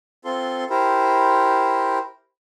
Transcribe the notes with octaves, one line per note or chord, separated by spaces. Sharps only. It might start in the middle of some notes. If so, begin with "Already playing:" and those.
C4 F4 A4 C6
E4 G4 A#4 C5